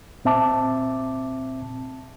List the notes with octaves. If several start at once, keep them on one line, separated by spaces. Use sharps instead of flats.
A#2 C4 E5 A5 D6